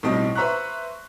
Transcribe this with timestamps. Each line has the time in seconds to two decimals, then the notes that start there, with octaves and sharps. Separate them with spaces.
0.03 B1 A2 G3 C4 D#5 A5
0.35 B4 C5 E5 A#5 C#6 F#6